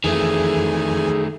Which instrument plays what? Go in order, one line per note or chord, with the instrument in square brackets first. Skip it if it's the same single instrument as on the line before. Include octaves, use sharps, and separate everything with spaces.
[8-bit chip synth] F2 E3 G#5 [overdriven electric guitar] D#3 A3 [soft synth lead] G#4